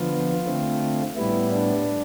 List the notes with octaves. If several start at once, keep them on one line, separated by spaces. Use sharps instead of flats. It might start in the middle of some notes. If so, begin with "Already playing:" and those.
Already playing: D3 F3 B3 F4
D3 A3 C4
A2 G3 B3 E4
D4